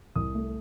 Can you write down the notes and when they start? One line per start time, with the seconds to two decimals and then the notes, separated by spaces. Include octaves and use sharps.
0.15 C2 D#6
0.35 A3